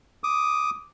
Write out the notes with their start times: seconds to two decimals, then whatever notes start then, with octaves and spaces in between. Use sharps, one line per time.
0.24 D6 D#6